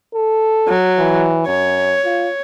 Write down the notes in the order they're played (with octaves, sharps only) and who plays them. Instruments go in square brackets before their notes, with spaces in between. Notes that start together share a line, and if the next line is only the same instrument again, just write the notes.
[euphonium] A4
[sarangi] F#3
[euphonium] E3
[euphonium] F#2 [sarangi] C#5
[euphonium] F4